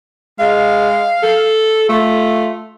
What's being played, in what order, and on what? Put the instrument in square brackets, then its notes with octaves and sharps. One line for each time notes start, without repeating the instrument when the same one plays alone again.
[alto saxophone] G#3 [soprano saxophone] F5
[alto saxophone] A4
[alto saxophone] A3 [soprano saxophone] F4